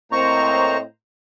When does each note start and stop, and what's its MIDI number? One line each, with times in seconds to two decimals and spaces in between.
0.12 0.83 45
0.12 0.77 58
0.12 0.83 60
0.12 0.77 72
0.12 0.83 75
0.12 0.77 82
0.12 0.78 85